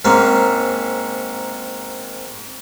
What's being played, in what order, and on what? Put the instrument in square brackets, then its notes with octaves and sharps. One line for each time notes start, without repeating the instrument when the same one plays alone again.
[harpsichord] G#2 A#3 C4 C#4